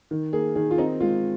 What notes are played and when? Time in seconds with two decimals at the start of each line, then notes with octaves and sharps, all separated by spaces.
0.11 D#3
0.33 A#3 G#4
0.55 D#3 G#4
0.71 F4
0.78 C4 D#4
1.00 G#3 F4